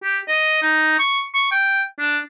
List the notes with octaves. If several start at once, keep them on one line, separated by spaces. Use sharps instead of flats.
G4
D#5
D#4
C#6
C#6
G5
D4